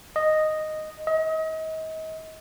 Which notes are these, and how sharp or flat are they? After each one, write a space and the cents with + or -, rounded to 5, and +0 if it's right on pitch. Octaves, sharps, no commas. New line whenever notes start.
D#5 -5
D#5 +35